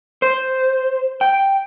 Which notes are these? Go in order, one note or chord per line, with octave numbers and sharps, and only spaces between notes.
C5
G5